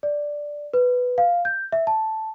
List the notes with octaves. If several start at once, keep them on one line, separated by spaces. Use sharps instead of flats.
D5
B4
F5
G6
E5
A5